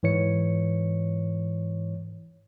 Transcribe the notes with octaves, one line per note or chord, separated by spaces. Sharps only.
G#2 E3 C#5 C#7